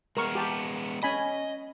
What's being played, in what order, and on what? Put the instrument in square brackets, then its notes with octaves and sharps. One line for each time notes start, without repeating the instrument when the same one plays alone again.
[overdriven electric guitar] G#3 B3 [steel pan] A#4 C#6
[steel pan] G4 A5
[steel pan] C#4 G#5 B5 [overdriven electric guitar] D#5